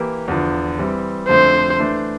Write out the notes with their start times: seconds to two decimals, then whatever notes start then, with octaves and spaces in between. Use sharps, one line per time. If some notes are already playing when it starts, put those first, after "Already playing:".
Already playing: E3 A#3 E4 G4
0.28 E2 D3 F3
0.79 E3 G3 C4
1.29 F2 D3 A3 C5
1.79 E3 A3 D4